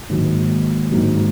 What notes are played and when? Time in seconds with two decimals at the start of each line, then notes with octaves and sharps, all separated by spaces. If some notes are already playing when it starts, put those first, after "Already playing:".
0.09 G#2 D#3 F#3 A#3
0.91 G#2 D#3 F#3 A#3